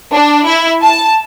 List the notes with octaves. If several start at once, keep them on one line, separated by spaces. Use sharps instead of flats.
D4
E4
A5